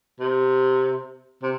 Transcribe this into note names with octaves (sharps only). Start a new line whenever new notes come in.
C3
C3